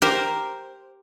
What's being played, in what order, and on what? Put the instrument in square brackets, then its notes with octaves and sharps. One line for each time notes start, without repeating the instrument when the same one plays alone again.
[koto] G4 A#4 C5